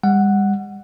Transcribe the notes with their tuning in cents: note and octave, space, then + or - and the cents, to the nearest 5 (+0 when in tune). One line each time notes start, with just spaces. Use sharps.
G3 +40 F#5 +0